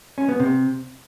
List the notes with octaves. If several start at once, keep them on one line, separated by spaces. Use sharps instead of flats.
C#4
B3
C3